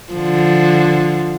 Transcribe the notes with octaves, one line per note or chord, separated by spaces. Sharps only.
D3 F3